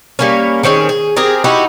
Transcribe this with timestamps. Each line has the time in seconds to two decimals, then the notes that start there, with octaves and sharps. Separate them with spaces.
0.19 G3 A#3 C#4
0.63 D#3 C4 C#4 G#4
0.89 G#4
1.16 C4 G4 G#4 A#4
1.44 D#4 E4 F#4 G4